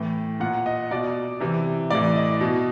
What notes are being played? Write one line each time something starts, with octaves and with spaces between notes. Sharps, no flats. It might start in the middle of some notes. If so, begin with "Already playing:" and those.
Already playing: A2 E3 G5
A#2 F#5
D#5
B2 D5
C3 E3
A2 E3 D5
D#5
B2